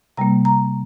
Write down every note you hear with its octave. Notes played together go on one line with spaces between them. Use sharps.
C3 G3 A#3 A#5
A#5